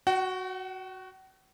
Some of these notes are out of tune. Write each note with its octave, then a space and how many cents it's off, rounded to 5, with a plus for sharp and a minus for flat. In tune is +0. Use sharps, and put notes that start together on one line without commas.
F#4 +0 F#5 +45